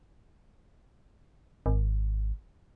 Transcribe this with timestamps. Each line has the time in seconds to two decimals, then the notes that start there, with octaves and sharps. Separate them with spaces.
1.66 G#1